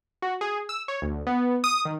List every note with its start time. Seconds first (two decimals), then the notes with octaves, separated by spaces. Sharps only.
0.22 F#4
0.41 G#4
0.69 E6
0.88 C#5
1.02 D2
1.27 B3
1.64 D#6
1.85 D#3